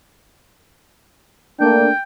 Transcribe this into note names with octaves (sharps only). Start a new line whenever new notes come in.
A3 A#3 D4 G5